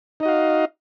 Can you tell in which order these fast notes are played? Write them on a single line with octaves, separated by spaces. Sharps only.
D#4 D#5 F#4 F5